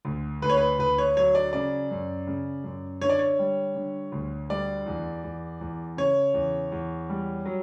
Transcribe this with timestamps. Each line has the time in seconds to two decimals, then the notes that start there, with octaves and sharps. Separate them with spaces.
0.05 D2
0.42 D2 B4
0.49 C#5
0.57 B4
0.79 D2 B4
0.98 C#5
1.17 F#3 C#5
1.35 D5
1.53 C#3 D5
1.91 F#2
2.27 C#3
2.64 F#2
3.01 D3 C#5
3.09 D5
3.19 C#5
3.39 G3
3.75 D3
4.12 D2
4.50 G3 D5
4.86 E2
5.24 E2
5.61 E2
5.97 C#3 C#5
6.34 E2
6.72 E2
7.09 G3
7.45 F#3